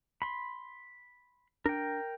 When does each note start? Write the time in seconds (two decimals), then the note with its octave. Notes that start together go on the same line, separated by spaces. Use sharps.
0.22 B5 C6
1.66 D4 A#4 G5